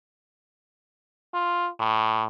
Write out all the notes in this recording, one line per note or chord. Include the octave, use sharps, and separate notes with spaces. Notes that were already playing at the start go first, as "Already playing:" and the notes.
F4
A2